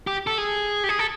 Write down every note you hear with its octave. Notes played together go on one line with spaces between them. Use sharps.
G4
A4
G#4
G4
G#4
A4